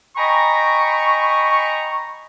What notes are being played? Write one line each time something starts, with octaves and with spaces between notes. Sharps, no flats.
D#5 G5 G#5 A#5 B5 C#6